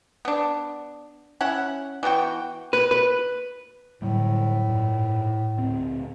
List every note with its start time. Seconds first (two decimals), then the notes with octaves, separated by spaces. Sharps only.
0.25 B3 D4
1.41 C#4 E4 F#5
2.03 E3 B3 F#4 G5
2.73 B4
2.91 B4
4.02 A2 D3 F#3 G3
4.69 G2 A#2
5.57 D2 A#2 C4